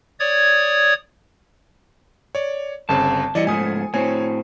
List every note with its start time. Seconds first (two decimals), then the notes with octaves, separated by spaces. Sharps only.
0.20 C#5 D5 D#6 G#6
2.35 C#5 D5
2.89 G1 C#3 C4 A5
3.35 E3 G3 D5 D#5 C#7
3.47 G#2 F3 A3 G#5 D#6
3.94 A2 C4 C#5 G#5